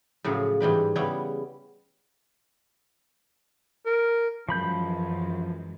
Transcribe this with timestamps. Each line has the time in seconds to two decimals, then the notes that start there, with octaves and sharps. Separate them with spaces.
0.24 A2 C#3 F3 F#3 G#4
0.60 G#2 E3 G3 B4
0.96 C#3 G3 B3 C#4 E4
3.86 A#4
4.49 F#2 E3 F3 G#3 B5 G6